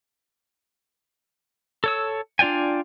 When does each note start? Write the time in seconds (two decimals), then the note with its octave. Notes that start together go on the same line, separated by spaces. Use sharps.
1.84 A4 C#5 E6
2.39 D4 F4 D5 G5 G#5